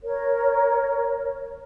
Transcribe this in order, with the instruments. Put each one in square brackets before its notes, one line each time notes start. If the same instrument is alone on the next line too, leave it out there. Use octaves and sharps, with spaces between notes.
[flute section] A#4 C#5